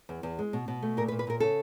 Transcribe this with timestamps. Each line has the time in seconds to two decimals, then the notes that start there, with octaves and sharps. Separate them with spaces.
0.09 E2
0.23 E2
0.39 G#3
0.53 B2
0.68 B2
0.83 A3
0.97 A#2 A#4
1.08 B4
1.12 A#2
1.19 B4
1.27 A#2 A#4
1.40 C#3 A4